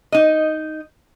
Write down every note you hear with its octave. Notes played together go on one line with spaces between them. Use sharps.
D#4 D#5